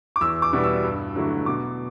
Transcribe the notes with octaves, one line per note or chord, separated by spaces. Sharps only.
D6
E2 E6
D6
B2 G3 B3 E4
E6
G2
D3 F#3 A3 E4
B2 D6